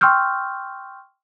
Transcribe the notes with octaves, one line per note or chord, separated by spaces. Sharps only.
G5 C6 C#6 E6 F6 G6